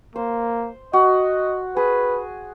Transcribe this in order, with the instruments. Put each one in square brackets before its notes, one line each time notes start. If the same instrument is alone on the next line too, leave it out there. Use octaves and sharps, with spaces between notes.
[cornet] A#3 [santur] C5
[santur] F#4 [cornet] D#5
[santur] G#4 [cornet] B4